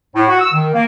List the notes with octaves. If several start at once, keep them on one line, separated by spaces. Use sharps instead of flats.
A2
F#4
E6
D#3
A#3